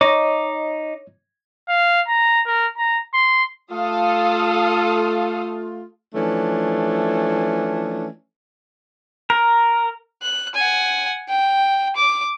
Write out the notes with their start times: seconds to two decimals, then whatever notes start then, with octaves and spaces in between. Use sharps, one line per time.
0.01 D#4 C#5 D#5 D6
1.69 F5
2.07 A#5
2.46 A#4
2.77 A#5
3.14 C6
3.71 A3 F4 A4 F5 D#6
6.15 E3 F3 A3 C#4 D4
9.30 A#4
10.22 F#6
10.55 F#5 G#5
11.29 G5
11.96 D6